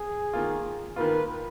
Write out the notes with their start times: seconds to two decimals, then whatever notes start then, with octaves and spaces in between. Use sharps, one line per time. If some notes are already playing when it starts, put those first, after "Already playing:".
Already playing: G#4
0.33 D#3 A#3 F4
0.96 D#3 A#3 F4 B4